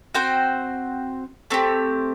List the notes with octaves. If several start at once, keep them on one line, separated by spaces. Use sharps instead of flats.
C4 F#4 C5 G5
A3 C4 G4